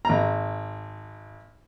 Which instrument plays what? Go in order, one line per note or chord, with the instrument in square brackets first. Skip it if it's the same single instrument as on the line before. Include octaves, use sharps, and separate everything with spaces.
[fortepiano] G#1 A#5